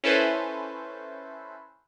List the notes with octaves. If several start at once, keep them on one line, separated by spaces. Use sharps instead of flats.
C#4 E4 A4 B4 C5